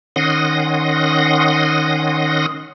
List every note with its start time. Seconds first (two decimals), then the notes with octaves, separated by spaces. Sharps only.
0.16 D#3 C#4 F#5 C6 D#6 A#6